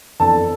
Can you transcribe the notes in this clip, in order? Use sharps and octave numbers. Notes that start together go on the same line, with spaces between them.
F2 E3 B3 D4 A4 A5